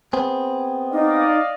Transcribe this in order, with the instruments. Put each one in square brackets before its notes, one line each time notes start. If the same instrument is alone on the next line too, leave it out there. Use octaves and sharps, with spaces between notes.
[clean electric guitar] B3 C4 G#4
[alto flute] D#4 [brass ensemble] D5 D#5 F5